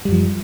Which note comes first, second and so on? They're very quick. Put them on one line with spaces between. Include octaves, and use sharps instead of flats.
G3 F#2 F3